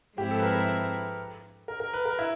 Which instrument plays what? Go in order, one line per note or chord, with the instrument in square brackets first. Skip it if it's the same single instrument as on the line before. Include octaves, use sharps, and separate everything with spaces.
[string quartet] G#2 F3 G#3 C4 E4 [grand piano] G4
[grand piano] A4
B4
A#4
A#4
A#4
A#4
B4
A#4
E4